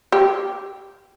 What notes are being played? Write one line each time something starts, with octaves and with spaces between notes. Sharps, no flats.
G4